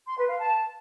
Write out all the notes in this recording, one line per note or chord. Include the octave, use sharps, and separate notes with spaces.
C6
B4
F5
A5